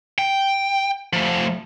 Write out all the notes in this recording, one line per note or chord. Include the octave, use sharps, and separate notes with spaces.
G5
F3 A3